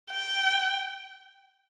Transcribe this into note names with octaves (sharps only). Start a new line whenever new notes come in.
G5